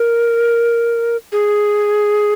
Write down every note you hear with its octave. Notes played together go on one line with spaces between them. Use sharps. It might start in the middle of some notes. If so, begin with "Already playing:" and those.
Already playing: A#4
G#4